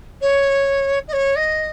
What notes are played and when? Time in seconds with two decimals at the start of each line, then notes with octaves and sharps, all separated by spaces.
0.21 C#5
1.08 D#5
1.13 C#5
1.36 D#5